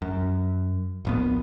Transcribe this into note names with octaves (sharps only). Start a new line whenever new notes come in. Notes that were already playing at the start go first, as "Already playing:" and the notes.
F#2
D1 A#1 B3